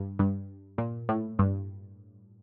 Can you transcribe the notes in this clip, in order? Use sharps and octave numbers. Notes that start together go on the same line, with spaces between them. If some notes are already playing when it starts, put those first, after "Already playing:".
Already playing: G2
G2
A#2
A2
G2